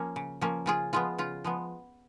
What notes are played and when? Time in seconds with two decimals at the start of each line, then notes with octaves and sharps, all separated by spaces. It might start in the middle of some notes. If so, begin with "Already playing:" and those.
Already playing: F3 A#3 C#4
0.16 C#3
0.41 F3 A#3 C#4
0.66 C#3 F4 G#4
0.93 F3 G#3 B3 F4
1.18 C#3 F4
1.44 F3 G#3 B3